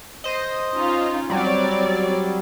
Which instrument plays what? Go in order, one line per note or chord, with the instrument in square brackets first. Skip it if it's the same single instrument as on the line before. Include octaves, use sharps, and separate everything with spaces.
[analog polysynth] C5 D#5
[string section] C#4 D#4 F4
[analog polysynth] F#3 G3 [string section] C4 C#5 D5